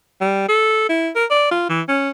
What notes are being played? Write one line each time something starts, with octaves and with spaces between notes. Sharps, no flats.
G3
A4
E4
A#4
D5
F4
E3
C#4